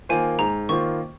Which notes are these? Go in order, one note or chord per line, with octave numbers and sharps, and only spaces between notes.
D#3 A#3 F4 C5 G#5
G#2 A#5
D#3 A#3 F4 C5 C#6